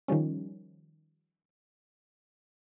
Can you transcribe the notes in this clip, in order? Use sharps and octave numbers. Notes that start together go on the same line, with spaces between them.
D#3 F3 G3 C#4